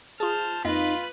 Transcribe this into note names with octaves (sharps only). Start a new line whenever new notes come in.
F4 G#4 C5 A5 F6
F2 A#3 D#4 F4 B4 D#5 B5